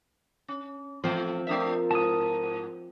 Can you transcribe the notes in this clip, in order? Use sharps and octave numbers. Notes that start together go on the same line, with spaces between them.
C#4
E3 F3 A3 C4
A3 D4 F4 A#4 E5
G#2 A5 D#6